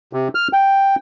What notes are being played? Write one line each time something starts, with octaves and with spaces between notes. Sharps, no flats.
C3
F6
G5